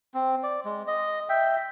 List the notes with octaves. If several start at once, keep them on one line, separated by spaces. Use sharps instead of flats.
C4
D5
G#3
D#5
E5 G5